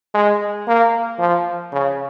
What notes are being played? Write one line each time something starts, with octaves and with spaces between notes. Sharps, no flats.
G#3
A#3
F3
C#3